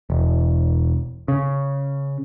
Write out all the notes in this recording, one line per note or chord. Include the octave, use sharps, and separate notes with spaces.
E1
C#3